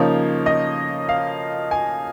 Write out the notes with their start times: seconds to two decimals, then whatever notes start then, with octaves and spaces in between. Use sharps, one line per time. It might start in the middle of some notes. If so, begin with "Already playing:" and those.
Already playing: C#3 F3 A#3 D#4 C#5
0.46 D#5
1.09 F5
1.71 G#5